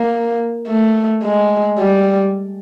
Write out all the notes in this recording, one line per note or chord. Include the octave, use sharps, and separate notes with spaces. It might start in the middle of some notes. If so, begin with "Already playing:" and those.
Already playing: A#3
A3
G#3
G3